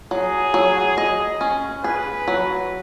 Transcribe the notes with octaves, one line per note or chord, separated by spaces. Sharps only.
F#3 G#4
F#3
D#5
C#4
G#4 B4
F#3